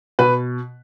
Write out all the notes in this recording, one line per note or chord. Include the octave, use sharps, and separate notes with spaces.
B2 B4